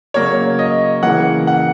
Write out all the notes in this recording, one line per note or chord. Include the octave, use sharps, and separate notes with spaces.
C#3 F#3 A#3 C#5
D#5
C#3 E3 A#3 F#5
F#5